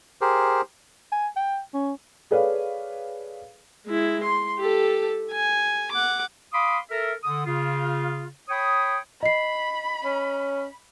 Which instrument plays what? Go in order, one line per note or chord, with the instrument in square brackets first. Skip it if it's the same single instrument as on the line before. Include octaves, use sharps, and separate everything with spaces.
[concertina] G4 G#4 A#4 C5
[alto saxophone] G#5
G5
C#4
[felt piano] G#4 A4 B4 C#5 D5 F5
[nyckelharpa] G#3 E4
C6
G4 A4
G#5
F#5 D6
[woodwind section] F5 B5 C6 D6 D#6
A4 A#4 E5
D3 D#6
C#3 F4
C#5 G5 B5 D#6
[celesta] D#5 C7 [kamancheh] B5
[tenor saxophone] C#4